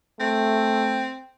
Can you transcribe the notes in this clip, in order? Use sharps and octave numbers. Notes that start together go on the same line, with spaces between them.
A3 C4